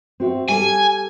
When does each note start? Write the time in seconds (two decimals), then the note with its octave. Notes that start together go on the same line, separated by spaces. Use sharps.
0.20 C4 F#4 E5
0.49 G3 A4 G#5